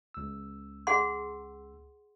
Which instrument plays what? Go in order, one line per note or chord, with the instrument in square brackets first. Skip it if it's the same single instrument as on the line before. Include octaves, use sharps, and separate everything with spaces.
[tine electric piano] C#2 E6
[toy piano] G#4 F#5 C6